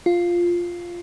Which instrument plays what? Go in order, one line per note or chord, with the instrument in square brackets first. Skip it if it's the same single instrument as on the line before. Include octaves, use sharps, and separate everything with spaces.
[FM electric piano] F4